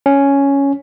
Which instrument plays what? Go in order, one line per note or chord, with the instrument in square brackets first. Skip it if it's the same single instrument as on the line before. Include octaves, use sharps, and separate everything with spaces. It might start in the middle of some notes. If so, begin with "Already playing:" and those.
[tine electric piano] C#4